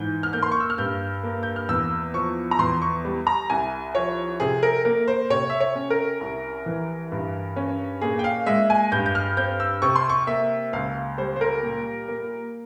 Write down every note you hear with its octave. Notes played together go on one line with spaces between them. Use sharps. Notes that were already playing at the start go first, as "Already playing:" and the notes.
Already playing: G#2 E3 G6
F6
A#3 G6
C6
C#6
E6
F6
G2 G6
A#3
G6
F6
E2 E6
F3 C#6
A#5
E2 C6
C#6
G3
A#5
C2 G#5
F3 C#5
C3 G#4
A#4
A#3 A#4
C5
C3 C#5
E5
C#5
C#4
A#4
C2
E3
G2
C#4
A#2 G#4
G5
F5
G#3 E5
G#5
G2 G6
G6
F6
C4 G6
E6
C3 C#6
C6
C#6
A#3 E5
C#2 F5
G3 C5
C5
A#4
A#2
A#3